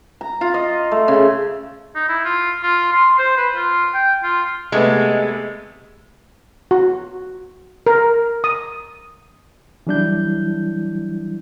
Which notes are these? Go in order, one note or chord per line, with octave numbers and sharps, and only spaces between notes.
A#5
F4
D#5
A3
C#3
D#4
E4
F4
F4
C6
C5
B4
F4
G5
F4
C3 G#3 A3 B3
F#4
A#4
D#6
E3 F#3 G3 D4 E4 G6